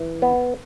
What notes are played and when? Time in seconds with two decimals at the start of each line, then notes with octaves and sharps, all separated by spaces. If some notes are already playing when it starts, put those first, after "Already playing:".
Already playing: E3
0.22 B3